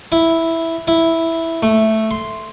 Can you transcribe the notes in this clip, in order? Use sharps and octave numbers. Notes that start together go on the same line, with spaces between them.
E4
E4
A3
C6